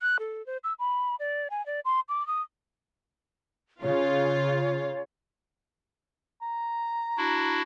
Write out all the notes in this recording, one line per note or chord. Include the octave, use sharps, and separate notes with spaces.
F#6
A4
C5
E6
B5
D5
G#5
D5
C6
D6
D#6
C#3 F4 C#5
A#5
D4 E4 F#4